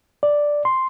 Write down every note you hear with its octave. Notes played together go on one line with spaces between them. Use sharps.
D5
C6